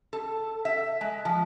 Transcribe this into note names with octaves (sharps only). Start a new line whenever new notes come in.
A4
E5
G#3
F3